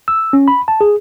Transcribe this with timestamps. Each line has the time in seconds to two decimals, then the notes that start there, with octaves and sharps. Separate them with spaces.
0.08 E6
0.33 C#4
0.48 B5
0.68 A5
0.81 G#4